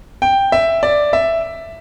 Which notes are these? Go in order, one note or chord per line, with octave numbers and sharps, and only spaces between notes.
G5
E5
D5
E5